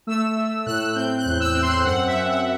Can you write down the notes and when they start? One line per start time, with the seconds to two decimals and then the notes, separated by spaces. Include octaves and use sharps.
0.07 A3 E6
0.36 A3
0.66 A2 F#6
0.95 C4 G6
1.17 F#6
1.25 E2
1.40 E6
1.54 C4
1.62 C6
1.84 F#2 F#5
2.07 E5
2.14 F#2
2.29 F#5